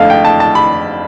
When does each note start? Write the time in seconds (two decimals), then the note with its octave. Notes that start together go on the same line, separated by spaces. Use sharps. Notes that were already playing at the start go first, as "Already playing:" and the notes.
Already playing: F2 D3 A3 F5 A5
0.10 G5
0.25 A5
0.40 A5
0.55 B5